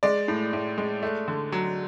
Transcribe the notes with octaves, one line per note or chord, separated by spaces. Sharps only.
G#3 D5
A2
A2
G#3
A3
D3
F#3